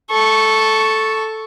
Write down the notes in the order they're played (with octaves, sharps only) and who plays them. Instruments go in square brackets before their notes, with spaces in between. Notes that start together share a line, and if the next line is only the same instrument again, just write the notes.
[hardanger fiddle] A4 C#6